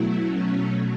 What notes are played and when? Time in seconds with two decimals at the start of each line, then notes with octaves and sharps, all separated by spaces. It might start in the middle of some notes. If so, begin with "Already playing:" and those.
Already playing: B2 F#3 A3 E4
0.23 C#4